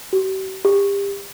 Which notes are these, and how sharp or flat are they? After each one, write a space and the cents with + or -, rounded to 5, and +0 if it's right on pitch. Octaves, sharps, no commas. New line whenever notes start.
G4 -45
G4 +30